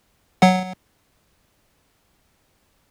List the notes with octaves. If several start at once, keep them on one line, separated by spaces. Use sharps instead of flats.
F#3 F#5